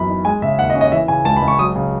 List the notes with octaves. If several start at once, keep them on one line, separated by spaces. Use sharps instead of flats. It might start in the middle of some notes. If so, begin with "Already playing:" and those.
Already playing: F#2 E3 B3 B5
D#4
G#3 G#5
C#3 E5
D#2 F#5
D#5
C#4
D#5
E3 E5
C#3 G#5
C#2 A5
B5
C#2
C#6
F#3 D#6
C#3